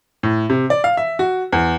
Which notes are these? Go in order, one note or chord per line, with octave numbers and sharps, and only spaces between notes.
A2
C3
D5
F5
E5
F#4
E2